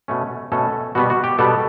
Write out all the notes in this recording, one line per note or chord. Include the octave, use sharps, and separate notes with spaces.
B2 A3 C#4
B2 A3 C#4 A4
B2 G3 B3 F#4
F#4
G4
B2 G3 B3 A4